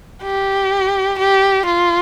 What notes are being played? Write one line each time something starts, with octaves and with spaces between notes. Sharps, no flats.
G4
G4
F4